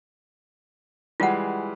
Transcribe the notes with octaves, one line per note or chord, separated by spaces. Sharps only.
E3 G3 G#3 F4 F#5